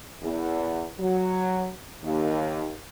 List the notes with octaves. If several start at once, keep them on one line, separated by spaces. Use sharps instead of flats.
E2
F#3
D#2